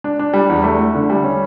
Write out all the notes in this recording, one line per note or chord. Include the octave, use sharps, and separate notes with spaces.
D4
D4
G3
E2
A3
A3
D3
G3
C#4